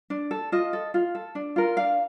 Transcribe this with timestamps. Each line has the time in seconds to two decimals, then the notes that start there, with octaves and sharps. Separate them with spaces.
0.10 D4
0.31 A4
0.52 F4 D#5
0.73 A4
0.94 F4
1.15 A4
1.35 D4
1.56 F4 A#4
1.77 D4 F5